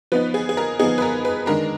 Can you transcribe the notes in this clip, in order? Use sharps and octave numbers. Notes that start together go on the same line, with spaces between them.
F3 B3 D#4 B4
G#4
G#4
A#4
F3 B3 D#4 G#4
B4
A#4
B4
D#3 G#3 D4 A#4